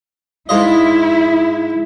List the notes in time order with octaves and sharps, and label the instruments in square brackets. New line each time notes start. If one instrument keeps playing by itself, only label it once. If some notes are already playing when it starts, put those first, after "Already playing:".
[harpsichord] G#2 F4 D#5 [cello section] E4